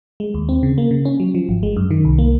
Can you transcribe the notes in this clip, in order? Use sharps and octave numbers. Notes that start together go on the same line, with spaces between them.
G#3
D#2
C4
C#3
A#3
C#3
C#4
F#3
F3
G#1
G#3
F#2
D#3
C2
A#3